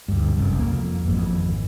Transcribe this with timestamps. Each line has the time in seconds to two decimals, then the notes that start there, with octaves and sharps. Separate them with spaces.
0.08 D2 G2
0.36 F#1 C2 F#2 C3
0.59 F2 A#3
1.07 G#1 F2 E3